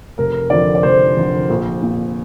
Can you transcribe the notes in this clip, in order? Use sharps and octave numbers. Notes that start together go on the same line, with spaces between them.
F1 A#4
F2 D3 D5
D5
F1 C5
F2 D3
A#1
A#2